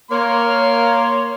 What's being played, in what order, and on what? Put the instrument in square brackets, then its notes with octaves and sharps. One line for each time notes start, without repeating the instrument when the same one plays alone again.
[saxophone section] A#3 [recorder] C#5 [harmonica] C6